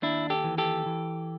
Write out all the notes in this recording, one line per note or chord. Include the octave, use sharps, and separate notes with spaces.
D#2 D4 E4
G4 A4
E3
G4 A4
E3